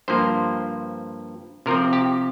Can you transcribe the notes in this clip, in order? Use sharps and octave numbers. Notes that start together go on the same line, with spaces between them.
G2 F3 A#3 C5
C3 F3 C4 A#4
G4